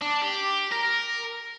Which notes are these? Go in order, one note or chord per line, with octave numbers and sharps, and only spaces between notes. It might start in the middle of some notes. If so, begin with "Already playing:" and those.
D4
G4
A#4